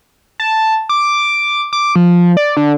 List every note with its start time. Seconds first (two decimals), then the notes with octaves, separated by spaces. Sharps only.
0.40 A5
0.89 D6
1.73 D6
1.96 F3
2.37 D5
2.57 D3